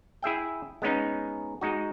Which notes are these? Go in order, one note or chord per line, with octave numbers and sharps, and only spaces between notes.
E4 G#4 E5 G5
G#3 B3 C#4 D#4
G#3 D#4 F#4